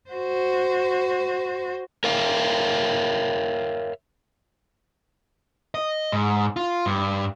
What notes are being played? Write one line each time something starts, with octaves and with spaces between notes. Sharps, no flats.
F#4 C5
A#4 C#5 E5 F5
D#5
G#2
F4
G2